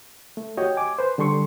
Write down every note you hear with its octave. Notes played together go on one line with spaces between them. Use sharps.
A3
F#4 G4 C#5 D#5 G5
G#5 D6
B4 C5
D3 G3 A4 C6 C#6